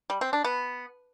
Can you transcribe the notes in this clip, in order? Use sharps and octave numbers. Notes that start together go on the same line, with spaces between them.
G3
C4
D4
B3